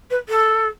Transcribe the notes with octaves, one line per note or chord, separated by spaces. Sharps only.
B4
A4